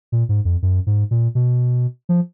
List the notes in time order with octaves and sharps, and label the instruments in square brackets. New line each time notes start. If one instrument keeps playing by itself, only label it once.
[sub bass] A#2
G#2
F2
F#2
G#2
A#2
B2
F3